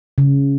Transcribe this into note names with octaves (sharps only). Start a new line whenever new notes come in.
C#3